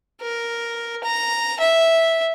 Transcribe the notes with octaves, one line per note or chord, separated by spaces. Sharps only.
A#4
A#5
E5